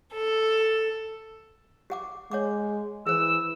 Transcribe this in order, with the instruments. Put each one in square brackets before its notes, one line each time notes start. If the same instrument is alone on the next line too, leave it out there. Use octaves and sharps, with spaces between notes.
[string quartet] A4
[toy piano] G4 F#5 D6
[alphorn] G#3 [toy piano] C#5 F#5 D6
[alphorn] E3 [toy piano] G#4 C5 [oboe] E6